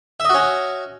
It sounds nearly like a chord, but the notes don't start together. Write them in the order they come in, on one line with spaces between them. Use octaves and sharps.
E5 D#5 F#4 C#4